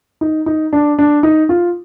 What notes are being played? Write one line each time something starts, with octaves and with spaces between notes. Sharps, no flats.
D#4
D#4
D4
D4
D#4
F4